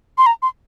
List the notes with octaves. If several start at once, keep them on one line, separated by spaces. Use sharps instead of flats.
C6
A#5
C6